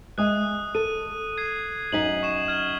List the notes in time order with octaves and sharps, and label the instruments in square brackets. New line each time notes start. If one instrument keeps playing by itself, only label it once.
[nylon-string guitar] G#3 E5 G#5 [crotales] D#6 F#6
[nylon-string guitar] A4 [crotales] D#7
[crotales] G#6 C7
[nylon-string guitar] F#2 D#4 G#5 [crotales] B6 F#7
[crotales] C#6 C7 E7
F6 G#6